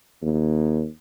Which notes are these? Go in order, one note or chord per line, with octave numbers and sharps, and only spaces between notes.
D#2